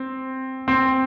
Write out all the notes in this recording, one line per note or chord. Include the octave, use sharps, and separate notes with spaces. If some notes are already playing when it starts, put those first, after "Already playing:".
Already playing: C4
C4